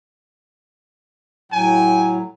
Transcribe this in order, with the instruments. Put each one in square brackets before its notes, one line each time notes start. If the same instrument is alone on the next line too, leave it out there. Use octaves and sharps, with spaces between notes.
[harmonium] A2 F#3 [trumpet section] G5 G#5